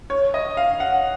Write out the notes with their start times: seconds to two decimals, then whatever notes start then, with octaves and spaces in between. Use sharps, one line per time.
0.10 C#5
0.34 D#5
0.57 F5
0.80 F#5